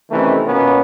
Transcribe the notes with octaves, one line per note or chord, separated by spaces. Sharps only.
C3 D#3 E3 A3 C#4
B2 A#3 B3 C#4 F4